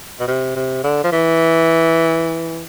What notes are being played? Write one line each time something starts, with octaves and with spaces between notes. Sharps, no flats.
B2
C3
C3
D3
F3
E3